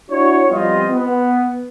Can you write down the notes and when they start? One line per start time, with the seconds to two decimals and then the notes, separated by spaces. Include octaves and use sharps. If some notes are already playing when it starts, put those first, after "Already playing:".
0.10 D4 E4 F#4 C#5
0.49 F3 G3 B3 C4 F4 D#5
0.90 B3